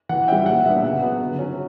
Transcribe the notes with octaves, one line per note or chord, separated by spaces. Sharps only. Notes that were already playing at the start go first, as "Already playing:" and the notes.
E3 F#5
G3 C#4 E5 G5
A#2 F#5
G3 B3 D4 E5
C#3 F#5
F#3 B3
D3
F#3 C#4